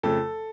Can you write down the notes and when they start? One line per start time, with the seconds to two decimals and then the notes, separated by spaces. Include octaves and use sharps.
0.03 F2 C#3 F3 A3 A4